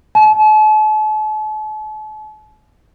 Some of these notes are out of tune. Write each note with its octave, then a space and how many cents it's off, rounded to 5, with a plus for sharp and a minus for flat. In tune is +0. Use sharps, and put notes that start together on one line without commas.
A5 -40